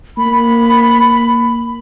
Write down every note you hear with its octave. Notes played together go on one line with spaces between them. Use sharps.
A#3 B5